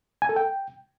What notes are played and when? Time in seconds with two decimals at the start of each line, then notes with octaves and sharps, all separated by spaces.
0.22 G#5
0.29 A4
0.36 G5